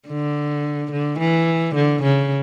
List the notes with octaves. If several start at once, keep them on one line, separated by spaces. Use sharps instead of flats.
D3
D3
E3
D3
C#3